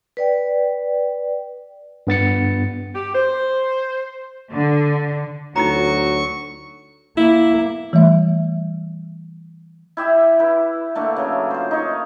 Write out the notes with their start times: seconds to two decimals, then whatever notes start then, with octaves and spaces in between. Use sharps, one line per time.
0.17 B4 D5 G5
2.07 G2 B3 A6 C#7
2.94 G4
3.14 C5
4.52 D3
5.56 D2 F#3 D#4 F4 A#5 C#6
7.17 A#3 E4
7.93 E3 G3 A3 E5
9.97 E4 G4 E5
10.39 E4 B4
10.95 D3 A3 A#3
11.16 C#3 F#3
11.50 F4 C5
11.71 D#4 C#5